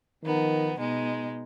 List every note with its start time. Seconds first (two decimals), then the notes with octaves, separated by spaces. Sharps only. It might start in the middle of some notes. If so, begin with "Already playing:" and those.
0.24 D#3 F3 B3 D#4
0.77 B2 G#3 D#4